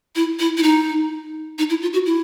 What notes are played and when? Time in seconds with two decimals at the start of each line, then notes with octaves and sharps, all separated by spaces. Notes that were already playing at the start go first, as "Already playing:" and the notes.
0.16 E4
0.39 E4
0.57 E4
0.63 D#4
1.59 D#4
1.70 E4
1.82 F4
1.93 F#4
2.06 E4